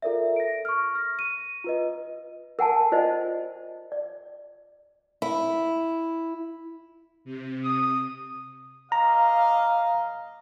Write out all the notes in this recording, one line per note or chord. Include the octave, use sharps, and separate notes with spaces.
F4 A4 A#4 D5 E5
A#6 D7
C#6 F6
F6 A#6
D#7
F4 B4 D#5
A#4 F#5 G#5 A5
F4 C5 D5 D#5
D5
E4
C3
D#6
A#3 D#5 F5 A#5